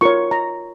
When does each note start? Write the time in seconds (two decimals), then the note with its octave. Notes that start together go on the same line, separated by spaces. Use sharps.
0.01 F4 A#4 C#5 C#6
0.31 A#5